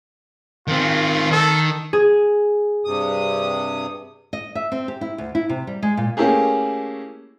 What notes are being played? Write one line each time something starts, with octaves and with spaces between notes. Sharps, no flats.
D#3 C4 F4
D#3 A4
G#4
G2 C3 D#6
D#5
E5
C4
G4
E4
D2
E4
C3
G3
G#3
A#2
A3 A#3 C#4 E4 G4 G#4